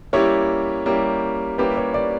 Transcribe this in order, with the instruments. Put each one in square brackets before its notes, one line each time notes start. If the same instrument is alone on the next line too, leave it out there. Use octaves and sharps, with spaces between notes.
[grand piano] G3 A#3 C#4 E4 G4 [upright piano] C#5
[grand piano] G3 A#3 C#4 E4 G4
[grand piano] G3 A#3 C#4 E4 G4 [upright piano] B4
[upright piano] C#5
D5